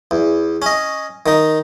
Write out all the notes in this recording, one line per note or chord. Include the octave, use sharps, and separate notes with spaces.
E2
C#4 D#5
D#3 D#4